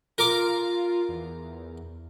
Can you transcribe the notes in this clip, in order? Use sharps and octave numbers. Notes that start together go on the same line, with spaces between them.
F4 A#4 D6
E2